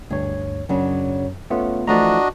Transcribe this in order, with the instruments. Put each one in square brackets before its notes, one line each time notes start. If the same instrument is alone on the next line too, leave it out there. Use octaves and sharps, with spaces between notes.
[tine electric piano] D2 G2 C#5 [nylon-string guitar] G#4
[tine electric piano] F#2 [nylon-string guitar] C#3 F#3 D4
[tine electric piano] A3 B3 F4 [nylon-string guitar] C#4
[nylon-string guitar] E3 F3 A3 [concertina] D4 F#4 D#5 [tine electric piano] D5 A#5